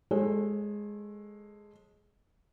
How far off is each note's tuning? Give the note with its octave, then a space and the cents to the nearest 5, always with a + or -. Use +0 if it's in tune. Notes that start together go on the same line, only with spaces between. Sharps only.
G#3 +0 A4 +0 C#5 -35